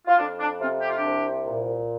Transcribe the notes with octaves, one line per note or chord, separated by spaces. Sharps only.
F4
F2 D4
D4
C3 C4 F4
G4
F4
D4 G4
C2
A#2